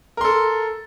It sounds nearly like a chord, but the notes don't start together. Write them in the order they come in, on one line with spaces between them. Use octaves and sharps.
A#4 C6 A4